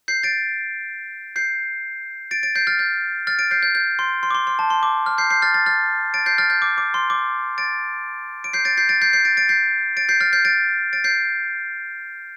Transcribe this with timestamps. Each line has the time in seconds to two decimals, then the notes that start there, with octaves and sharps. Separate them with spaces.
0.08 G6 C7
0.23 A6 D7
1.36 G6 C7
2.31 A6 D7
2.43 A6 D7
2.56 G6 C7
2.67 F6 A6
2.79 G6
3.27 F6 A6
3.39 A6 D7
3.51 G6 C7
3.63 G6
3.75 G6
3.99 C6
4.23 C6
4.31 D6
4.35 C6
4.47 C6
4.59 A5
4.70 C6
4.83 D6
5.06 F6
5.18 G6 C7
5.30 G6 C7
5.42 F6 A6
5.54 F6 A6
5.66 F6 A6
6.14 A6 D7
6.26 G6 C7
6.38 F6 A6
6.50 G6
6.62 D6
6.78 D6
6.94 C6
7.10 D6
7.58 A6 D7
8.44 D7
8.53 G6 C7
8.65 A6 D7
8.77 G6 C7
8.89 A6 D7
9.02 G6 C7
9.13 G6 C7
9.25 A6 D7
9.37 A6 D7
9.49 G6 C7
9.97 A6 D7
10.09 G6 C7
10.21 F6 A6
10.33 G6 C7
10.45 A6 D7
10.93 A6 D7
11.04 G6 C7